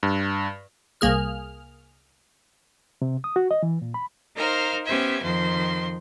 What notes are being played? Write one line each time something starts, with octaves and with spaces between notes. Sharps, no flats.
G2
C2 A#3 G#4 F6
C3
D#6
F#4
D#5
E3
A#2
B5
D#4 A#4 C5 F5
B3 C#4 G4 C5 E5 G#6
F2 D#3 F3 C5 C6